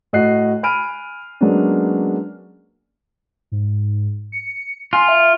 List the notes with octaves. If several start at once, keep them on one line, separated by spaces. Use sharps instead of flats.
A2 F#4 D#5 F#6 C7
G#5 B5 F6 D7 D#7
F#3 G#3 A#3 B3 C#4 D4
G#2
C#7
F4 G#5
E5